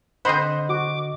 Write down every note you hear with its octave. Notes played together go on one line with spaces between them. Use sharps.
D3 C4 C5 D#5 F#5 B5 C6 D#6
F#4 D6